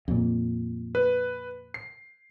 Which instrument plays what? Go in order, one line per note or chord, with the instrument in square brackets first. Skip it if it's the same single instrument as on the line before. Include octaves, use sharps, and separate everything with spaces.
[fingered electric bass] F2 A#2
[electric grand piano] B4
C7